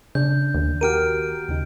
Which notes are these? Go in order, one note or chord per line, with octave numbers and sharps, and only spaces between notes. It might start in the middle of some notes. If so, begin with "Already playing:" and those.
C#3 D4 G6
D#2
F#4 G4 A#4 F6 D7 D#7
D#2 C#3 D#4